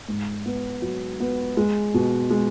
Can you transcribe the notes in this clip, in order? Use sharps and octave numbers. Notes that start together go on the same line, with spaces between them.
G#2
B3
F#3
B3
G#3
B2
G#3